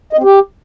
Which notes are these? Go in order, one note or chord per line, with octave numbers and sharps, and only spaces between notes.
D#5
C4
G4